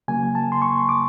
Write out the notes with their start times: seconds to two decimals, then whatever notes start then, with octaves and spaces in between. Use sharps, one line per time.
0.08 C#3 F#3 A#3 G#5
0.35 A5
0.52 C6
0.62 C#6
0.89 D6